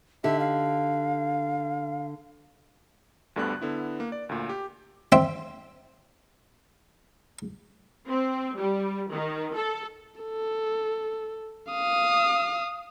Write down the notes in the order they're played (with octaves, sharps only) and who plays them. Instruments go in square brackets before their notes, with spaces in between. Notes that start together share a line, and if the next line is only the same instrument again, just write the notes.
[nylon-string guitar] D3 D#4 G4 [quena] E5
[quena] F5
[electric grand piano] D2 G2 D3 G3 B3 F#6
D3 B3 E4
A#3
D5
D2 A#2
G4
[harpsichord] C4 E5
[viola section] C4
G3
D#3
A4
[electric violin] A4
F5 D#6